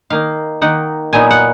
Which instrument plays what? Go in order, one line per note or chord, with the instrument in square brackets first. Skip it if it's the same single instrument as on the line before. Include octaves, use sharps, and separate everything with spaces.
[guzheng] D#3 A#3 D#4 F5
D#3 A#3 D#4 F#5
A#2 F#3 B3 D#4 G#5
F#5